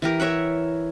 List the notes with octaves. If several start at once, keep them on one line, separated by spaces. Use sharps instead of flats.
E3 G4 A#4
A#4 C#5 E5 F#5